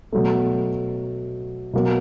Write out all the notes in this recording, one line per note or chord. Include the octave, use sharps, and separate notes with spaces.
B2 F#3 A3
B2 F#3 A#3